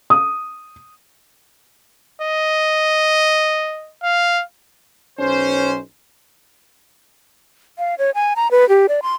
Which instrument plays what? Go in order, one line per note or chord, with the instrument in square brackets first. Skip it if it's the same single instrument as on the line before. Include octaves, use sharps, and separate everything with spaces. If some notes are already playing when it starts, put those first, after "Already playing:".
[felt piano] D#6
[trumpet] D#5
F5
[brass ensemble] B1 C#4 C5
[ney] F5
C#5
G#5
A#5
B4
G4
D5
C6